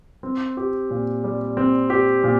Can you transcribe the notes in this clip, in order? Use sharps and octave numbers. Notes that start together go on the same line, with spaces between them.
C4
G4
A#2
G3
C4
G4
A#2